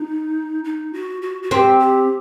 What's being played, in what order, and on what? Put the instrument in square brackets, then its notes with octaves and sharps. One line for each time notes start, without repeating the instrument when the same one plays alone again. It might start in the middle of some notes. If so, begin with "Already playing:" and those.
Already playing: [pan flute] D#4
D#4
F#4
F#4
F#4
[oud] C4 [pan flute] G4
[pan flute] G4